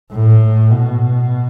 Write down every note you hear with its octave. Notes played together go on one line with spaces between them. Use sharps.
A2
B2